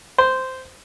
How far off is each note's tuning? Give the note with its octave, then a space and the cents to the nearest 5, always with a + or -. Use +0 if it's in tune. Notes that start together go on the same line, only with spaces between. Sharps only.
C5 -10